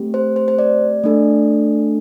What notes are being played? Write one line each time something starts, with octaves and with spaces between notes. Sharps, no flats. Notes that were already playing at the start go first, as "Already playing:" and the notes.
Already playing: A3 C4 G4
C5
C5
C5
D5
A3 D4 A4